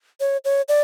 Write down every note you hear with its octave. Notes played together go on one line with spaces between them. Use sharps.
C#5
C#5
D5